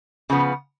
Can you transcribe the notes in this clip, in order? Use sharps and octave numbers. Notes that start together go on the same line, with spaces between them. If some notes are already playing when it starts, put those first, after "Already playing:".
C#3 F3 B3